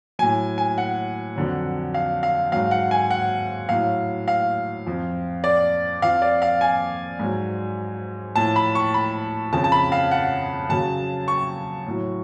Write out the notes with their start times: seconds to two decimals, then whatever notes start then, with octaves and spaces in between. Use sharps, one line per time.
0.19 A2 F#3 G#5
0.58 G#5
0.78 F#5
1.36 F2 D3 F#3
1.94 F5
2.23 F5
2.52 G#2 F#3 F5
2.71 F#5
2.91 G#5
3.11 F#5
3.69 A2 F#3 F5
4.28 F5
4.86 F2 F3
5.44 D5
6.02 F2 F3 F5
6.22 D5
6.42 F5
6.61 G#5
7.19 G#2 F#3
8.36 A2 F3 A5
8.56 B5
8.75 C#6
8.94 B5
9.53 F2 C#3 F3 A5
9.64 A5
9.72 B5
9.92 F5
10.11 F#5
10.69 F#2 C#3 F#3 A5
11.28 C#6
11.86 A2 F#3